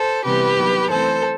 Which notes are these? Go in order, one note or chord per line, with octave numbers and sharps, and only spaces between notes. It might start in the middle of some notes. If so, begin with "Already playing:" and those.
Already playing: A4 C5
C3 E3 G3 B3 G4 B4
D#3 F#3 B3
E3 A3 C4 A4 C5